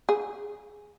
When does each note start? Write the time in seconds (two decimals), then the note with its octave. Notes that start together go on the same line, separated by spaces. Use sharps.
0.09 G#4